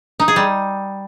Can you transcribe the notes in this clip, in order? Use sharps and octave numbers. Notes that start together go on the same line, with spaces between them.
D#4
G#4
G3